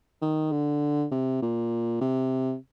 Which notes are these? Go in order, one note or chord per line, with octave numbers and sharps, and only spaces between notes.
D#3
D3
C3
A#2
C3